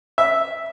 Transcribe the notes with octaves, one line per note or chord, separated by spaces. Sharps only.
E5